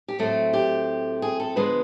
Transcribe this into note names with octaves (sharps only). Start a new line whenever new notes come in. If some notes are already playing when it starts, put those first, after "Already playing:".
G4
A2 F#3 A3 C4 F#4
G4
G#4
A4
D3 F3 G#3 B3 B4